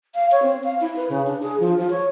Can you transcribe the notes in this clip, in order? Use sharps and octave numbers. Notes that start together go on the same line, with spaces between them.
F5
C#5
C4
F5
E4
B4
C#3
D4
G#4
F3
F3
C#5